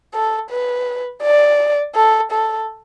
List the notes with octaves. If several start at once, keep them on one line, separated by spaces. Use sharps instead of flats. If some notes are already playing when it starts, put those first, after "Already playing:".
A4
B4
D5
A4
A4